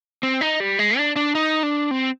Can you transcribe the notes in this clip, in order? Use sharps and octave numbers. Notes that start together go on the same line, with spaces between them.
C4
D#4
G3
G#3
D4
D4
D#4
D4
C4